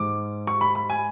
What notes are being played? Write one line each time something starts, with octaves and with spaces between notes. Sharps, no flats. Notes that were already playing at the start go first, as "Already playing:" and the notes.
Already playing: G#2 D6
C#6
B5
B5
G#5